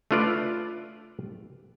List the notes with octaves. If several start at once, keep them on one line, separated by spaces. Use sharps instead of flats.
A3 D4 F4 B4 D5